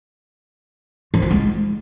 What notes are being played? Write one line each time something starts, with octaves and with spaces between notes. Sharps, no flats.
F3
F4
G#3